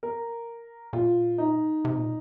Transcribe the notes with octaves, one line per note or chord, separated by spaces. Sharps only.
A#4
A#2 F4
D#4
C3
A#2